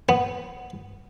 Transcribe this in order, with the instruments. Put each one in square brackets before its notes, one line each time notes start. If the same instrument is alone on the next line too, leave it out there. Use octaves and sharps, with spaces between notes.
[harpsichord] B3